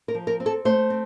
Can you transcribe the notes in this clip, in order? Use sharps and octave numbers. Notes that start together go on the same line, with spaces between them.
A#4
F3
A#4
C4
A4
A3 C5
C4